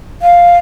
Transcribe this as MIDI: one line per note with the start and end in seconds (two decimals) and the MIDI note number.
0.22 0.56 77